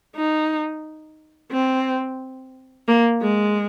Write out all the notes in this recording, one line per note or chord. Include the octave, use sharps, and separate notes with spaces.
D#4
C4
A#3
G#3